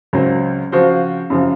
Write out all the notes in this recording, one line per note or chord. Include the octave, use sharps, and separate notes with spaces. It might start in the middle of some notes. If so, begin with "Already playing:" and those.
C#2 C#3 F#3 C4
C#3 F3 C4 F#4 C5
F#2 C#3 F3